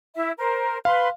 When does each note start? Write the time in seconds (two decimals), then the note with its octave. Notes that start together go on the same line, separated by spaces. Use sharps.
0.15 E4 E5
0.37 A#4 C5
0.85 B4 F5 C6